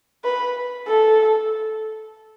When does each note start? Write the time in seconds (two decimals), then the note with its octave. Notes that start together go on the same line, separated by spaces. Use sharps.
0.24 B4
0.87 A4